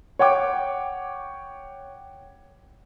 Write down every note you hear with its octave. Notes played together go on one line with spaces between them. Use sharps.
C#5 F#5 G5 D6